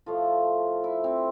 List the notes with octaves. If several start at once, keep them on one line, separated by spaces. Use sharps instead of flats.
A2 F3 A3 F4
E4
C4